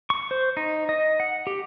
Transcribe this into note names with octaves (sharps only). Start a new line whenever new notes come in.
C#6
C5
D#4
D#5
F#5
G4